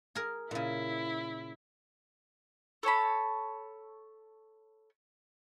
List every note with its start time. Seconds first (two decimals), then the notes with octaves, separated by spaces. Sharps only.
0.15 G#4 A#4
0.51 A#2 C#3 E4
2.83 A4 C#5 A5 B5